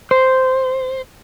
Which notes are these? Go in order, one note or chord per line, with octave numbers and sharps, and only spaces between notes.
C5